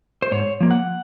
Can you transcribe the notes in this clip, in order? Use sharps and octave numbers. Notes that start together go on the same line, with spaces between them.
C5
G#2 C#5
F3 A#3
F#5